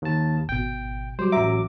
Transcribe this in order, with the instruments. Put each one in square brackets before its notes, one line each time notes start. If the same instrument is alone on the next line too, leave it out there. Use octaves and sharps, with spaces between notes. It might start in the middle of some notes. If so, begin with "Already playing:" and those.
[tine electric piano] D#2 A5
[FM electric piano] G#1 B2 [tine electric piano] G5
[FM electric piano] F#3 G3 D6 [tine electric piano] C5
[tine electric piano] A1 F#3 D6 [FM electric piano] E5 A#5